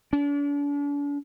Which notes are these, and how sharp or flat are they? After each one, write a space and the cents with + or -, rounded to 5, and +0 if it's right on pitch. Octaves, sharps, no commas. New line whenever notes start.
D4 -40